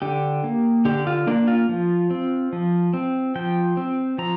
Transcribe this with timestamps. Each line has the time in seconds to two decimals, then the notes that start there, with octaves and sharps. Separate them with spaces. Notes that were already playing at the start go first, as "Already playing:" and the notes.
0.02 D3 G4
0.44 A#3
0.85 D3 G4
1.07 F4
1.27 A#3 D4
1.48 F4
1.69 F3
2.11 C4
2.53 F3
2.94 C4
3.35 F3 G5
3.77 C4
4.18 F3 A#5